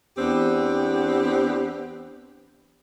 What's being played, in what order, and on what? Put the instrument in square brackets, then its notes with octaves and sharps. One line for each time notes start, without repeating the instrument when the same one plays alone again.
[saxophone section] E2 B3 C4 D4 G4